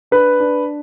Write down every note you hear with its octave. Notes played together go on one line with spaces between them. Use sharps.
D4 B4
D4